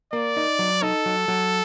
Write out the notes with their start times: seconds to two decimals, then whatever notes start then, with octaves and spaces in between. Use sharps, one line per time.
0.13 A#3 D5
0.37 D#4
0.59 F#3
0.82 D#4 A4
1.06 F#3
1.28 F#3